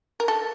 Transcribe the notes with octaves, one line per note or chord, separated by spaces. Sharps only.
A#4
A4